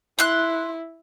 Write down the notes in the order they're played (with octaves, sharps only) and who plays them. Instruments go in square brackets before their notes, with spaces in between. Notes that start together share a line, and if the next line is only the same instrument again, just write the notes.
[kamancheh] E4 [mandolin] C6 F#6